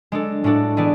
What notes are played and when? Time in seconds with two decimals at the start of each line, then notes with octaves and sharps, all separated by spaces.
0.12 G#3 D4 A4
0.44 A2 G#3 D4 F#4 A4
0.77 E3 B3 E4 G#4 D5